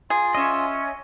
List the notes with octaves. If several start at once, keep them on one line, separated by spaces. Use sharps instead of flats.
F4 G#4
C#4 D#5 E5